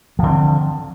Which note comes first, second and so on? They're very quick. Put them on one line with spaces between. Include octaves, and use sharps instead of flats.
F3 D3 C4